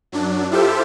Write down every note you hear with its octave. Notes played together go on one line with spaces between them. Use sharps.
F#2 F#3 D4
E4 F4 G4 A4 C5 E5